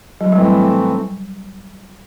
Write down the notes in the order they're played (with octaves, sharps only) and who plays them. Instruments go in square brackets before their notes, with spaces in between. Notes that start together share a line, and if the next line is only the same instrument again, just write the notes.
[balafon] F#3
[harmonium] A2 E3 A3 C4 [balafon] G3